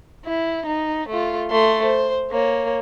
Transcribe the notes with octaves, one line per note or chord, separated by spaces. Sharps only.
E4
D#4
A3 F4
A3 C6
C5
A#3 C#5